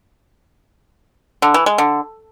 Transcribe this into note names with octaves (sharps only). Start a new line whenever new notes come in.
D3
E3
G#3
D3